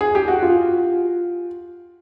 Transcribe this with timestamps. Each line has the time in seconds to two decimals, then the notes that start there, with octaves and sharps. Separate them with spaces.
0.01 G#4
0.15 G4
0.28 F#4
0.42 F4